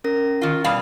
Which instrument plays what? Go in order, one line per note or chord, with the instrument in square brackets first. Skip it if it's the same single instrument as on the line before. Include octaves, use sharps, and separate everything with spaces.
[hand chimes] C#4 A#4 A#6
[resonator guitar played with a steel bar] D#3 F4
B2 G3 F5